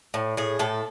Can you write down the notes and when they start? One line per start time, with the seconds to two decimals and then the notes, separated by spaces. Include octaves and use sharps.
0.14 A2
0.37 A2 G#4
0.59 A2 A4